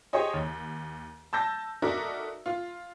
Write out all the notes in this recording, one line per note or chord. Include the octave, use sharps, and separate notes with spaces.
G4 G#4 C5 C#5 D#5 G#5
D#2
A5 E6 G6 A#6
D#4 F#4 A4 A#4 D5 E5
F4